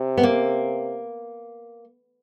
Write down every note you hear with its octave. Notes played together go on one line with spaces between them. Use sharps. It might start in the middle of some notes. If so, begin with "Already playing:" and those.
Already playing: C3
B3
A#3